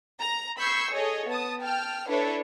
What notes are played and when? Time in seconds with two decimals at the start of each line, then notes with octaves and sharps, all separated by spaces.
0.22 A#5
0.59 B5 C#6 E6 G6 G#6 C7
0.92 G#4 A4 C#5 D#5
1.28 B3 A5 D#6
1.61 G5 A5 F6
2.07 D4 E4 A4 B4 C#5